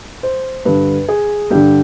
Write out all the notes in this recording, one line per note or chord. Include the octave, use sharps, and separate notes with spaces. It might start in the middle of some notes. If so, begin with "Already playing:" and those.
C5
G2 D3 B4
G#4
G2 D3 G4